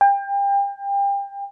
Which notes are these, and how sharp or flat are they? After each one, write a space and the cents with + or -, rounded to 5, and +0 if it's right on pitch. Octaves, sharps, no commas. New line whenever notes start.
G5 +30